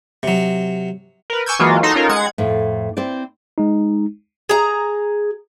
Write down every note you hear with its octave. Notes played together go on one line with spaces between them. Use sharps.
C3 F#3
A#4 B4
G#5 C#6 D6 E6 G6 G#6
E3 F#3 G#3 A#3 F4 F#4
D#4 F#4 A4 A#5 C6
C#4 D#4 F4 A4 A#4
G#3 F#5 G#6
F2 A2
C4 E4 C5 D5
G#3 D#4
G#4 A#5